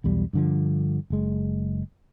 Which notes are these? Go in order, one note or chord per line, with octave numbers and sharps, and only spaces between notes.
B1 E2 G3
G2 D3 F3
F#1 G#3